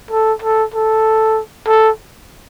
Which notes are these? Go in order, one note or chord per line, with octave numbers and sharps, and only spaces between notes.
A4
A4
A4
A4